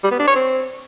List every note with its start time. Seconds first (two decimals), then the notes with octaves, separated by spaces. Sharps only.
0.03 G3
0.11 B3
0.19 D4
0.27 C#5
0.35 C4